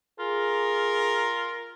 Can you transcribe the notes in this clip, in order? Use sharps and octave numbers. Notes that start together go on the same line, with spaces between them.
F4 G#4 A#4